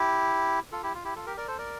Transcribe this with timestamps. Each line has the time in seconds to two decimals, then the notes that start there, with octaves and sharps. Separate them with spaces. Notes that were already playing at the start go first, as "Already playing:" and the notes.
Already playing: E4 G4
0.72 F4 A4
0.83 E4 G4
0.94 F4
1.04 E4 G4
1.16 F4 A4
1.26 G4 A#4
1.37 A#4 D5
1.48 A4 C5
1.58 A#4 D5